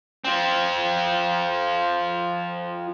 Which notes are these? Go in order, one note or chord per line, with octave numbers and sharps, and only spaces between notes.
F3 C4